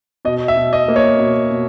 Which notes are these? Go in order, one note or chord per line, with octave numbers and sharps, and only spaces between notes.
B2 D#5
E5
B2
D#5
A#3
C#5
B2
B2